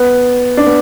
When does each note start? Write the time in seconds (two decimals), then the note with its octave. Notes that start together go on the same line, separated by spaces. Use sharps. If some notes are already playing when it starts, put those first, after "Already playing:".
Already playing: B3
0.57 D4
0.66 B3